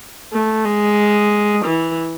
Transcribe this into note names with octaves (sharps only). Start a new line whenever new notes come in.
A3
G#3
E3